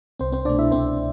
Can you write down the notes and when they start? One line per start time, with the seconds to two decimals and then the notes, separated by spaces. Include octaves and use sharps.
0.20 C2 C4 C5
0.32 C4 C5
0.45 B2 A3 D4 D5
0.59 E4 E5
0.71 C2 C4 C5